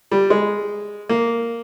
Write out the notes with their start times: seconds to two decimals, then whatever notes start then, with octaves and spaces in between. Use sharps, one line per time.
0.11 G3
0.30 G#3
1.09 A#3